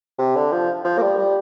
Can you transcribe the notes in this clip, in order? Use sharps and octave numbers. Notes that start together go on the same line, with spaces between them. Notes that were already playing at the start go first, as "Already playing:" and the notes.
C3
D3
F3
F3
A#3
G3
G3